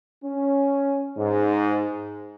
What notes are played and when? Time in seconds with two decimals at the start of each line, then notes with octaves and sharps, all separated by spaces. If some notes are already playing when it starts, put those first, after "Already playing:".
0.25 C#4
1.17 G#2